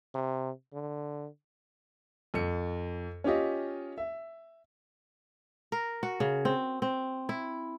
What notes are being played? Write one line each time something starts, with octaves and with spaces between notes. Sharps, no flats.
C3
D3
F2 C#7
C#4 F4 G4 D#5
E5
A#4
F#4
C#3
C4
C4
E4